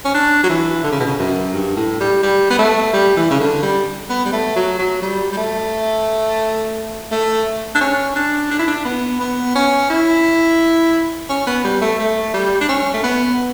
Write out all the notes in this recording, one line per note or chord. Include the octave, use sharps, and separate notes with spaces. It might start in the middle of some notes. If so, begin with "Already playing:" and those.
C#4
D4
F#3
E3
D3
C#3
B2
C#3
F#2
G2
A2
G3
G3
B3
A3
G3
E3
C#3
D3
G3
B3
G3
A3
F#3
F#3
G3
G3
A3
A3
D4
C#4
D4
D4
E4
D4
B3
B3
C#4
E4
C#4
B3
G3
A3
A3
G3
D4
C#4
A3
B3